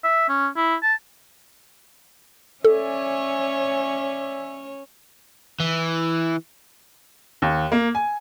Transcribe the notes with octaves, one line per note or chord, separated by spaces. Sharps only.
E5
C#4
E4
A5
C#4 A4 C#5 D5 E5 G#5
E3
D#2
A#3
G#5